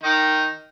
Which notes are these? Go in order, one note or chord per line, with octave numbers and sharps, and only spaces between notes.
D#3 D#4